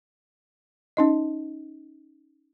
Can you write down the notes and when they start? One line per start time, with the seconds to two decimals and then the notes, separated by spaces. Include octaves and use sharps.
0.97 C#4 D#4 D#5